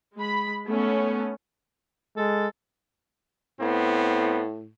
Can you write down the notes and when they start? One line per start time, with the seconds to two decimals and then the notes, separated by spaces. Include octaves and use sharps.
0.17 G#3 B5
0.67 A3 B3 C#4
2.17 G#3 A4
3.60 A2 B3 C4